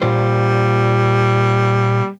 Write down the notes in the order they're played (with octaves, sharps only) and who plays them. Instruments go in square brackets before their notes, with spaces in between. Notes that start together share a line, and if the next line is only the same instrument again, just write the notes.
[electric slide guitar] A#2 F4 C5 [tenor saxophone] G3